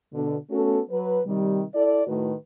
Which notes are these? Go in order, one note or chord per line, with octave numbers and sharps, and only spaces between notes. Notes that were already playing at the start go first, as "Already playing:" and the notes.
B2 D3
A3 B3 C#4 F#4 A4
F#3 B4
C3 D#3 G3
E4 A4 D5
A2 D#3 A3 F#4 B4